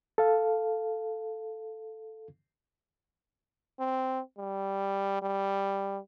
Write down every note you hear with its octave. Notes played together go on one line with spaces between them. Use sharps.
A4 F5
C4
G3
G3